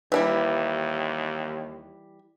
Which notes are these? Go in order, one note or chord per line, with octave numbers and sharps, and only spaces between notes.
D#2 E3 G3 E4